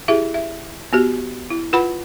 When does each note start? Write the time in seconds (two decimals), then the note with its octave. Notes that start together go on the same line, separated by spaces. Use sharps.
0.08 E4 G4 G#4 E5
0.34 E5
0.93 B3 F#4 G4
1.50 E4
1.73 F4 B4 F#5 B5